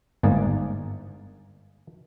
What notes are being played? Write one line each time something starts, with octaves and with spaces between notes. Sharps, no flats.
G1 G#2 A#3 G#4 D5